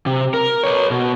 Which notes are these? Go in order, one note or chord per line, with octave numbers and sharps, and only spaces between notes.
C3
A#4
B4 C#5
B2